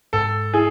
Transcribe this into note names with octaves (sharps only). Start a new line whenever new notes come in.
G#2 A4
E4 G#4